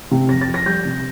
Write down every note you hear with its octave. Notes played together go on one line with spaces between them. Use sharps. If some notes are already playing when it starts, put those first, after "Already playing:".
C3
F2 A#6
A6
F3
A#6
G3 G6
C3